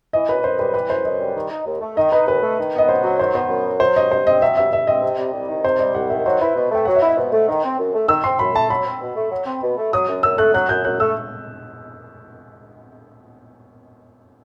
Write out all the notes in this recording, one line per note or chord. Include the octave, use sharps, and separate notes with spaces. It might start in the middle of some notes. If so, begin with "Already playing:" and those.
E3 D#5
F#2 B4
F#2 C5
G3 B4
E3 B4
F#2 C5
F#2 D#5
G3
D#3
D#4
D#2
A3
D#3 D#5
D#4 B4
D#2 B4
A3
D#3
B3 D#5
F#2 C5
F#3
D#3 C5
B3 C5
F#2
F#3
F#3 C5
G2 D#5
G2 C5
C4 D#5
F#3 E5
G2 E5
G2 E5
C4 D#5
C3
G3
C2
D#3
C3 C5
G3 D#5
C2 F#5
D#3 E5
F#3 C5
E4 B4
B2
A3 G5
F#3 F#5
E5
E4
D#5
B2 C5
A3
D#3
C4
F#2
A3
D#3 E6
C4 C6
F#2 B5
A3 A5
F#3 B5
C4
B2
A3
F#3
C4
B2
A3
F#3 D#6
F#2
F#2 E6
A3 F#6
F#3 F#6
F#2 G6
F#2 F#6
A3 E6